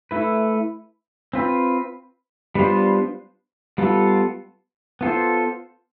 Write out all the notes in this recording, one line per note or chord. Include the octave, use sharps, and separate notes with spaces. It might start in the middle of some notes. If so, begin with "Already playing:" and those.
A3 E4 B4
C4 F4 B4
G3 B3 D4 F4 C5
G3 B3 F4 A4
B3 F4 A4 C5